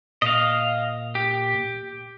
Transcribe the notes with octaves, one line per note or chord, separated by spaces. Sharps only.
A#2 D#5 F5
G4